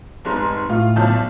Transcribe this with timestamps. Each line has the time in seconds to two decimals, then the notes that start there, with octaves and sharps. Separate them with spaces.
0.25 F1 G#2
0.70 A2 F4
0.96 B1 F3 A5